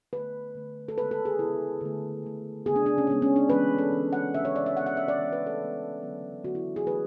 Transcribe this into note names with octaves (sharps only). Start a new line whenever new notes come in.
D3 A3 B4
D3 A3
A4
C#3 G#3 B3 B4
A4
G#4
C#3 G#3 B3 E4
D3 A3
D3 A3
C#3 G#3 B3 G#4
D4
D4
C#4
C#3 G#3 B3 D4
C#4
D4
E3 G#3 B3 B4
A4
E3 G#3 B3
F#5
C#3 G#3 B3 E5
C#5
D5
E5
C#3 G#3 B3 F#5
F#5
E5
D5
E3 G#3 B3
B4
A4
E3 G#3 B3
D3 F#3 B3
D3 F#3 B3 F#4
E4
G#4
E3 A3 B4